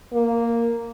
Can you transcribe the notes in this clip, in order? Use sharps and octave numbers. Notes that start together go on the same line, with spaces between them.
A#3